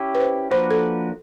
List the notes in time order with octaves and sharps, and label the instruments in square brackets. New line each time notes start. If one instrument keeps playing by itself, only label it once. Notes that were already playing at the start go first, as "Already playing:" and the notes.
Already playing: [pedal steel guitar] C#4 E4 G4
[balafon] B4
C5
[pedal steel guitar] F3 A#3 D4 F#4 B4 [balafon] C5
[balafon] A4